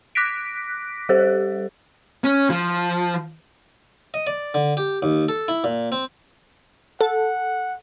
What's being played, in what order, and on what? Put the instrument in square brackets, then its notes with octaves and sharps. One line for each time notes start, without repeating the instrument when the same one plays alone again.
[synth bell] D6 F#6 A#6 B6 D7
G3 G4 A4 C5
[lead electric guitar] C#4
F3
[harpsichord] D#5
D5
D3
G4
D#2
A4
E4
A#2
C4
[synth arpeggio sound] A4 [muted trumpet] F#5